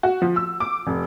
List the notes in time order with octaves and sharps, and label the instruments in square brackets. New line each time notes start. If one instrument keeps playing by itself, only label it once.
[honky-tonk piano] F#4
F3
E6
D6
F1